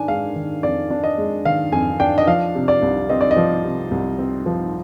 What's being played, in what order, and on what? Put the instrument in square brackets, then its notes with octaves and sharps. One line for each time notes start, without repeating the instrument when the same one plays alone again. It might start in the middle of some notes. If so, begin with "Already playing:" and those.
Already playing: [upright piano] D#3 D4 G#5
G#3 F5
D#3
F2 D5
D4
D#5
G#3
D#3 F5
F2 G#5
D4 G5
D#5
F3 F5
C3
D5
C2
C4 D#5
D5
D#5
F3
C3
C2
C4
F3